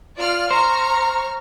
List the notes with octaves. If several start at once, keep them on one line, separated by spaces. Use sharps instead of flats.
F4 D5 F6
C5 A#5 C#6 F6